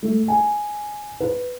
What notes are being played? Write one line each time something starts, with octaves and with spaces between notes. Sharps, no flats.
A3
G#5
B4